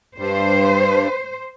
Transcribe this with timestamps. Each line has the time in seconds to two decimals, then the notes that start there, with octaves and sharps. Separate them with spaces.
0.18 G2 C5